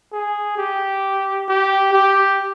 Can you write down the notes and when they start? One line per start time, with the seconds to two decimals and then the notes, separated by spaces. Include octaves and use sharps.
0.12 G#4
0.57 G4
1.48 G4
1.93 G4